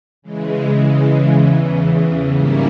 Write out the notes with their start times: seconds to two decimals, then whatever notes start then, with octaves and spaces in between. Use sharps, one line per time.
0.22 C#3 E3 G#3
1.29 E2 C#3 E3
2.33 G#2 G3 A#3 C#4 E4